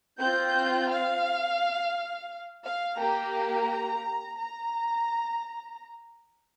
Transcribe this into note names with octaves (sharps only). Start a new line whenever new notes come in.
C4 F4 G6
F5
F5
A#3 G4 A#5
A#5